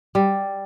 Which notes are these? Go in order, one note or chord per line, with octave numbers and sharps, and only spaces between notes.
G3